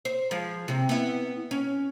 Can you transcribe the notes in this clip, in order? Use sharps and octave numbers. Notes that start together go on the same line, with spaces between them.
C5
F3 G#3
C3
B3 E4
C#4